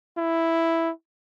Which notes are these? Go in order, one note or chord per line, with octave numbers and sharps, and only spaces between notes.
E4